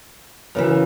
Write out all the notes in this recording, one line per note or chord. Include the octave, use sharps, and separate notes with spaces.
F#2 C#3 E3